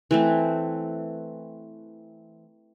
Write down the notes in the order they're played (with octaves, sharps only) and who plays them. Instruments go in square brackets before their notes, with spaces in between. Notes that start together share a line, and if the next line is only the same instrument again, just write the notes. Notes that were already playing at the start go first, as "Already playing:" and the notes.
[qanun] E3 A3 C4